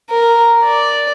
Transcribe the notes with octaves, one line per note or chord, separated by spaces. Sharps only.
A#4
D5